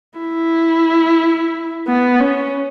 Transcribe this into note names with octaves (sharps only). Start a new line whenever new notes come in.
E4
B3
C#4